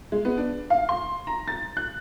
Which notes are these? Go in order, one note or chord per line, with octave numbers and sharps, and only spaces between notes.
G#3
B3
D4
F5
C6
A#5
A6
F#6